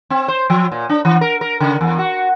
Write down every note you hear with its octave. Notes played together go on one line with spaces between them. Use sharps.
C4
C5
F3
A#2
D4
E3
A#4
A#4
C#3
E2
F#4